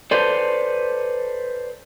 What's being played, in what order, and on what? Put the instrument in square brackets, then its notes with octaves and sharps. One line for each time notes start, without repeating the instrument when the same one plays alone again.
[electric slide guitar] A4 B4 C5 D5